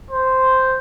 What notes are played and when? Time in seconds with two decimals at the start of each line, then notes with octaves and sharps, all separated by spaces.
0.11 C5